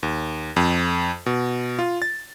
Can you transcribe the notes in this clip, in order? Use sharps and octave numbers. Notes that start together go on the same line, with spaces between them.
D#2
F2
B2
F4
A6